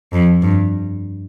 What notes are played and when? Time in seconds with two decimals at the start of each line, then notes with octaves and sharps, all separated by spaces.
0.13 F2
0.42 G2